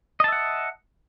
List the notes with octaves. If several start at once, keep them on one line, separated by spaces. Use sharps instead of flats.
D#5 E5 F#5 A5